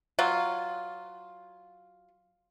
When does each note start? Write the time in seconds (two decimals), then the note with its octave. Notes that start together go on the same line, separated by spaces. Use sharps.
0.19 F#3 F4